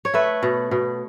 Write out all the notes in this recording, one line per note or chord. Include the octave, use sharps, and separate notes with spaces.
C#5
A3 B4 E5
B2
B2